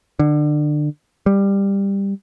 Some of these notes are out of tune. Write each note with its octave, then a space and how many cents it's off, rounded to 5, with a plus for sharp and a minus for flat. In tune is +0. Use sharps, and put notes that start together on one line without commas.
D3 +25
G3 +15